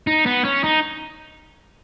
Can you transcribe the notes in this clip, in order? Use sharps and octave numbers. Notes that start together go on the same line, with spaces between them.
D#4
B3
C#4
D#4